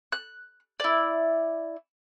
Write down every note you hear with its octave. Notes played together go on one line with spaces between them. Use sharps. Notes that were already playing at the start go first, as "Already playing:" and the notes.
F#6
E4 D5